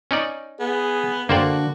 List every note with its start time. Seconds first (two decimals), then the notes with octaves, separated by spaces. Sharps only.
0.11 C#4 D#4 D5
0.60 B3 G#4
1.29 D3 A#3 D4 F#4 C5 D5 G5